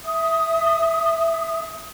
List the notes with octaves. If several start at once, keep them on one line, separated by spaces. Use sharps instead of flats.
E5 D#6